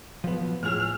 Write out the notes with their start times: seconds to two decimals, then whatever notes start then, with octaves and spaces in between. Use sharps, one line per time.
0.24 F3 F#3 B3
0.63 A2 F3 G#4 F6